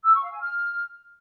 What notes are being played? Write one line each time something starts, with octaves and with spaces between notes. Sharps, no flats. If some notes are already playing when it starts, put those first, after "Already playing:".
E6
C#6
F5
G#5
F6